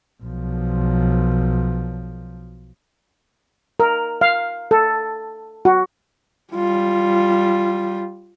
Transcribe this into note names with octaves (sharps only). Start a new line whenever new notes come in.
B1 F3
A#4
F5
A4
F#4
G3 F4